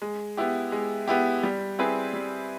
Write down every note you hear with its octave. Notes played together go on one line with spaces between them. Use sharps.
G#3
B3 E4 G4
G#3
B3 E4 G4
G3
C4 E4 G#4 B4
G3